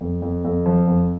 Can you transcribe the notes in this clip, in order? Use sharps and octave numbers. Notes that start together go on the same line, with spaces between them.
F2
F2
F2
F3
F2